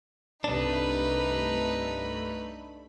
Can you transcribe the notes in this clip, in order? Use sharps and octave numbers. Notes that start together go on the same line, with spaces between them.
C2 G2 A3 D4 D#4 B4 B5